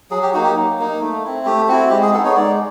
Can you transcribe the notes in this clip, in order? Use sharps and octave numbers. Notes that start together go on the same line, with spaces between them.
F#3 G#4
G4
A#3 D#4 F#4
G4
F#3
A#3 D#4
A3
C4 E4
A3 G4
C4 E4 F#4
G#3 G4
G#4
B3 D#4 A4
C#5
G#3 D5